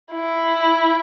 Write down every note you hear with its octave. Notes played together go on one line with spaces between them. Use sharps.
E4